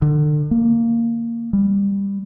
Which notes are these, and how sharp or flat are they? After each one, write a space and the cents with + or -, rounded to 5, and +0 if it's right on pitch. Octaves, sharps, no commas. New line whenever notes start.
D3 +35
A#3 -10
G3 +20